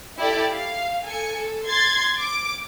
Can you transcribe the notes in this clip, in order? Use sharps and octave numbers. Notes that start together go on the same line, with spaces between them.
E4 G4 A4 D5
F5
A4 G#5 C#7
A4
C6 G#6 A6
D6 D7